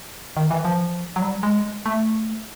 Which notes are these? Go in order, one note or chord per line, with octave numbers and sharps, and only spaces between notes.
D#3
E3
F3
F#3
G3
G#3
A3